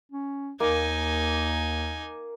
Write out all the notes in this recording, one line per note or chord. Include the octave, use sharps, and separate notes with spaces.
C#4
D#2 A#3 D#4 G#5